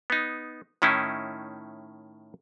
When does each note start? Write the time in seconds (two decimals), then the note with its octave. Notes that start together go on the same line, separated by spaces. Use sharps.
0.10 B3 D#4
0.82 A2 D#3 C#4 D#4 E4